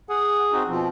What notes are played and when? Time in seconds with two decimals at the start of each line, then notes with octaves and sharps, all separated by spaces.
0.09 G#4 F#5
0.52 C4 D#4 F#4
0.67 B2 F3 C4